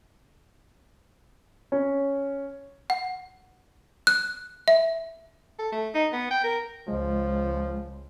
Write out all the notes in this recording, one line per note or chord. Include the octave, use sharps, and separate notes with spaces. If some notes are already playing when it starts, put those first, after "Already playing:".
C#4
F#5
F#6
E5
A4
A3
D#4
B3
G5
A#4
C#2 F3 G#3